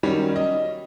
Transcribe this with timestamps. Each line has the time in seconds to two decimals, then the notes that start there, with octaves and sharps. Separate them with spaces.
0.03 D#3 F#3 G3 C#4
0.36 D#5